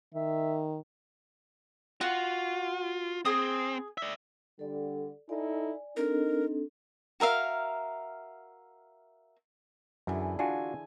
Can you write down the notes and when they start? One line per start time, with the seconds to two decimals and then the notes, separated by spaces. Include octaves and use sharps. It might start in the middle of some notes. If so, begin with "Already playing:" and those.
0.14 D#3 E5
2.01 F4 F#4
3.25 C4 G#4 D#6
3.98 D5 E5
4.59 D3 G3 A4 D5
5.29 D#4 E4 A4 D5 G#5
5.96 C4 D4 D#4 A4 A#4
7.20 F#4 A#4 E5 F5
10.07 F#2 D3 E3 G#4
10.39 D4 F4 F#4 G#5